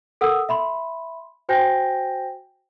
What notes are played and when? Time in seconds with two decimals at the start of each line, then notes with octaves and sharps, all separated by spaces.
0.21 A4 A#4 F#5 D#6 E6
0.49 E5 B5 C6
1.49 F#4 C5 G5 G#5 G6 A#6